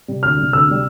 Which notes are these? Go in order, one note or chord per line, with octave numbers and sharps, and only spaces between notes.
C3 G3
D2 F6
C3 G3
D2 E6
C3 G3